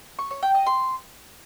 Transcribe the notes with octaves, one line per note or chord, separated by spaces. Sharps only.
C#6
C#5
G5
D#5
C6